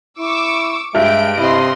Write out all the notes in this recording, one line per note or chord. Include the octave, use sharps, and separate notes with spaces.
E4 C#6 D6 E6
G2 G#3 E5 G5 D7
C3 E4 D#5 C6